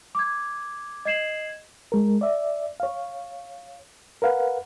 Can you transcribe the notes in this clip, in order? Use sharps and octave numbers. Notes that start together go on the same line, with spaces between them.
D6 G#6
D#5 G#6 C7 E7 F#7
G#3 A#4
D5 E5
C#5 F5
A#4 B4 F5 F#5